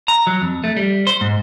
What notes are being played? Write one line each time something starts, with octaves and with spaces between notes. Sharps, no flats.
A#5
F#3
F2
A3
G3
C5
G#2